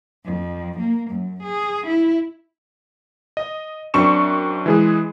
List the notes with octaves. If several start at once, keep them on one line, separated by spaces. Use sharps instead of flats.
F2
A#3
F#2
G#4
E4
D#5
F#2 C4 D4 C#6 E7
E3 G#3 G#4